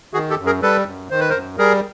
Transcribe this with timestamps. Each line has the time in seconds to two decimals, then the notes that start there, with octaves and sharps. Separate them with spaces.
0.13 D#3 F#4 G#4
0.30 G4 A4
0.38 F#2
0.46 G#4 A#4
0.62 G3 A4 B4
0.86 F#2
1.10 D#3 C5
1.20 B4
1.30 A#4 C5
1.34 F#2
1.58 G3 G#4 A#4